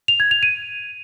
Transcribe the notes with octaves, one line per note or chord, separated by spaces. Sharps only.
F7
G#6
F7
D#7